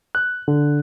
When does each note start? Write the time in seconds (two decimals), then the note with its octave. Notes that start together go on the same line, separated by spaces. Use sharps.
0.15 F#6
0.48 D3